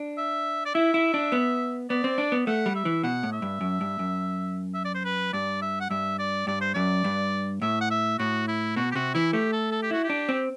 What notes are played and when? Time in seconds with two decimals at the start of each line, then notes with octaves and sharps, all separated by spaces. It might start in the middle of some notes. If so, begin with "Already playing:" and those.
Already playing: D4
0.17 E5
0.66 D5
0.75 E4 E5
0.94 E4
1.14 D4
1.32 B3
1.90 B3 D5
2.04 C4
2.18 D4
2.32 B3
2.47 A3 F#5
2.66 G3
2.75 E5
2.85 E3
3.03 B2 F#5
3.23 A2
3.33 E5
3.42 G2
3.61 F#2
3.81 G2
3.99 F#2
4.74 E5
4.85 D5
4.94 C5
5.04 B4
5.33 G2 D5
5.62 E5
5.80 F#5
5.90 G2 E5
6.19 D5
6.47 G2 D5
6.61 C5
6.74 F#2 D5
7.04 G2
7.62 A2 E5
7.81 F#5
7.90 E5
8.19 A2 F#4
8.48 E4
8.76 B2 F#4
8.92 G4
8.95 C3 F#4
9.14 E3 E4
9.33 A3 G4
9.52 A4
9.71 A4
9.83 G4
9.91 E4 F#4
10.04 G4
10.10 D4
10.29 C4